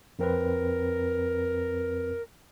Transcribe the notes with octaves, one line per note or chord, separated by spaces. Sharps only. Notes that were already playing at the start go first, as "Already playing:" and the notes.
F2 C4 A#4 B4